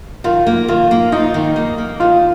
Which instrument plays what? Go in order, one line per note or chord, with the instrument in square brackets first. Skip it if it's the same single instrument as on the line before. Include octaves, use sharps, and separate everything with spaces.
[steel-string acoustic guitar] D#3 [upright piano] F4
[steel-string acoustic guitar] A#3
[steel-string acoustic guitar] D#3 [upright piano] F4
[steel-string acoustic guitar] A#3
[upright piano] D#4 [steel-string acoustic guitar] F4
[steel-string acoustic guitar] D#3
A#3
A#3
[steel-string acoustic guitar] D#3 [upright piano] F4